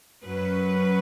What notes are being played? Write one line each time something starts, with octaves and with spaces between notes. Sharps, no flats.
F#2 F#3 C#4 B4